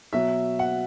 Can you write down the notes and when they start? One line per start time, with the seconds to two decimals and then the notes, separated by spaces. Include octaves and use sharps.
0.13 B2 F#3 E5
0.59 F#5